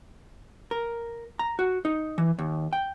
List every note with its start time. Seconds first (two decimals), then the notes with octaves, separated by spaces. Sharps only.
0.71 A#4
1.39 A#5
1.59 F#4
1.85 D#4
2.18 E3
2.39 D#2
2.73 G5